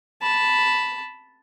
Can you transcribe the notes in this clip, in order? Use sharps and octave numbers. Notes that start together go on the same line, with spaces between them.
A5 B5